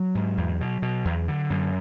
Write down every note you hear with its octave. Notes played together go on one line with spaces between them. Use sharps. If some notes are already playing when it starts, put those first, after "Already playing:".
Already playing: F#3
G#2
E2
B2
B2
E2
D3
F#2